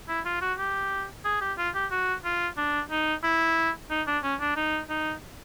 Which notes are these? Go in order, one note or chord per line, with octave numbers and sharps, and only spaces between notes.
E4
F4
F#4
G4
G#4
G4
F4
G4
F#4
F4
D4
D#4
E4
D#4
D4
C#4
D4
D#4
D#4